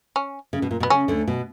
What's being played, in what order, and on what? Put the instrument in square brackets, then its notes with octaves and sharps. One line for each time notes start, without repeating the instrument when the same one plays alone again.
[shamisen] C#4
[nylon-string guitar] C#3
B2
A#2
B2
[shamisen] B3
[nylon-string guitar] C#3 [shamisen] C#4
[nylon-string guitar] D2 D3
B2